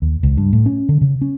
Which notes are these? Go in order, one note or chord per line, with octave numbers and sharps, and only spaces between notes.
D#2
C#2
G2
A2
C#4
D3
C#3
C#4